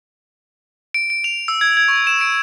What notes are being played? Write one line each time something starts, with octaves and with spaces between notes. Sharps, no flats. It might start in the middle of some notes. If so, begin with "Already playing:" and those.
D7
D7
F7
E6
G#6
G#6
C#6
E7
D7